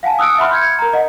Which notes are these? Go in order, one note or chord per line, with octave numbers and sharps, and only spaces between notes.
F5 F#5 G#5 A5
D#6 E6 F#6 C#7 D7
E5 F#5 B5 C6 F6
G6 G#6 C#7
A#4 A#5
D#5 F#5